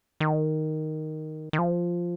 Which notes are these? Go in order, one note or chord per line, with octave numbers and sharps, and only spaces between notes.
D#3
D#3
F3